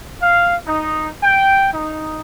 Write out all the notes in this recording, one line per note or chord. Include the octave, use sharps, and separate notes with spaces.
F5
D#4
G5
D#4